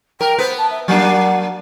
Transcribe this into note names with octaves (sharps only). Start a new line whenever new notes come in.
A#4 G5
B3 B4 C5
A5
E5
F#3 A#3 D4 F#5